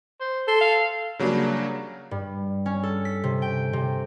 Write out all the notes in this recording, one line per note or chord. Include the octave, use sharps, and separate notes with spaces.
C5
A4 C6
F5
C#3 F#3 G3 A#3 D4
G2
C#4
A4
B6
C3
G5
C3